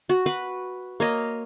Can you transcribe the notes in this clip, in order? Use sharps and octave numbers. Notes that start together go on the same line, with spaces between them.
F#4
B4 F#5
A#3 C#5 D#5